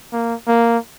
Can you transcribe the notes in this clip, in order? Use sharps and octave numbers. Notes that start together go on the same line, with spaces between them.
A#3
A#3